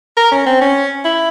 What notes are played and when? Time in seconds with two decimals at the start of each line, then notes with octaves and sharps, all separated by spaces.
0.17 A#4
0.32 C#4
0.46 C4
0.61 C#4
1.05 E4